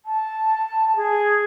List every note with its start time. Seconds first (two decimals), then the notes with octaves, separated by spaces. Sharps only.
0.05 A5
0.96 G#4